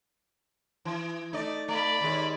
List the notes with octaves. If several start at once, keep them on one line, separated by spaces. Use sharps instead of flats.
E3
A3 D#4 D5
A3 D5 B5
D#2 G#3